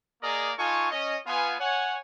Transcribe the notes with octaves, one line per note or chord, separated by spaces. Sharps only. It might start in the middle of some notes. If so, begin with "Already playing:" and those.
A#3 G#4 A#4 D5 D#5 A#5
D#4 F4 A4 G#5 C#6
C#4 D#5
B3 F4 G#5
C#5 F#5 G#5